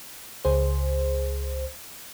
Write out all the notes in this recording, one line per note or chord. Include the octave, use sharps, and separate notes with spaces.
C#2 G#4 C5